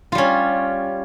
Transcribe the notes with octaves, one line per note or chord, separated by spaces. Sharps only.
G3 C#4 F4